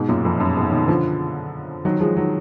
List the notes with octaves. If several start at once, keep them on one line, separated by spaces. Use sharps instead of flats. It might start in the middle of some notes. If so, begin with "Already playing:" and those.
Already playing: G#2 B2
F#2 A#2
F2
F#2
G#2 B2
B2 D#3
D3 F3
D#3 F#3
F3 G#3
D#3 F#3